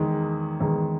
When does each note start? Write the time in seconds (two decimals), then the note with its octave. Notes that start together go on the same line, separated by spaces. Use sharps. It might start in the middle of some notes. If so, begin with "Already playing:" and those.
Already playing: E2 D#3 G#3
0.60 E2 D#3 G#3